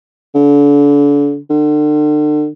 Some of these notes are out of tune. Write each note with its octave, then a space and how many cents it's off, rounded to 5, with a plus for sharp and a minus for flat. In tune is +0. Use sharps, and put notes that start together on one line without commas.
D3 -35
D3 +35